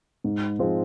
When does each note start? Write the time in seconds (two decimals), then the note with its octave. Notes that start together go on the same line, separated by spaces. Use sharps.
0.24 G#2
0.59 F3 G#3 C4